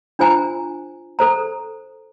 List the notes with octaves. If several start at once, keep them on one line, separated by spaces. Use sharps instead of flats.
D4 F4 C5 G#5 A#5
A4 C5 A#5